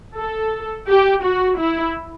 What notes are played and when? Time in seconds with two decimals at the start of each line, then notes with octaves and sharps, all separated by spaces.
0.17 A4
0.88 G4
1.23 F#4
1.58 E4